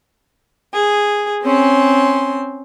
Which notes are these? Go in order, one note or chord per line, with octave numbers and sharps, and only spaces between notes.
G#4
C4 C#4 C6